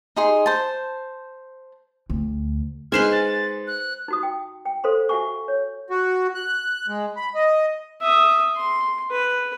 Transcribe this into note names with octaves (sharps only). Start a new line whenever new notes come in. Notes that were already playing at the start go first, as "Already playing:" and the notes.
D#4 G#4 C6
C5 A5
D2
G#3 D#4 B4 C5 G#5 F6 E7
A6
F#6
D#4 F#4 D#6
G5
G5
A4 C5 F5 C6
F#4 E5 F#5 G#5 C#6
C#5
F#4
F#6
G#3
B5
D#5
E5 D#6
C6
B4